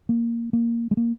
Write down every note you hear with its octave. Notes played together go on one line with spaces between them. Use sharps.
A#3
A#3
G#3
A#3